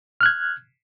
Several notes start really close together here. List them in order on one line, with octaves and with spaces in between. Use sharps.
F6 F#6 G#6